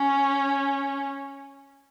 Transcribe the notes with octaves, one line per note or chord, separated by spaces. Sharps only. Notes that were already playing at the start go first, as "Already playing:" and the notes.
Already playing: C#4